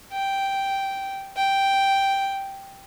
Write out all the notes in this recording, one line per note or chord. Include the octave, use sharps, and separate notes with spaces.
G5
G5